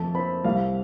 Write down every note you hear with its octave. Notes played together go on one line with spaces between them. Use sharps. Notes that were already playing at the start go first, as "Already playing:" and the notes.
Already playing: F2 A3 A5
C4 B5
C2 F5